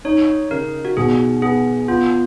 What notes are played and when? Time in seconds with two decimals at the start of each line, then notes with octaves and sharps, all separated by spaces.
0.05 D#4 C#5
0.51 C#3 A#4
0.85 F#4
0.97 B2 G#4
1.42 B3 G#4
1.88 B3 F4